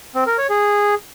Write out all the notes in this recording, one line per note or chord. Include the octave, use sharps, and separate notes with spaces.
C4
A#4
C#5
G#4